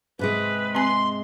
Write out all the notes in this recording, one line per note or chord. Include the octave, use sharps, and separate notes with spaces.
G#2 C3 G#3 B4
C4 G#5 C6